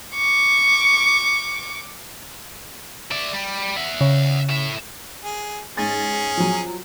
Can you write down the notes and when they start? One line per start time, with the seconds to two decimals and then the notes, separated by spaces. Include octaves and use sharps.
0.16 C#6 D6
3.12 D5 E5
3.33 G3
3.77 E5 F#5
4.01 C#3
4.50 A2 E5
5.24 G#4
5.77 G#2 C#4 G#4 A6
6.37 F3 F#3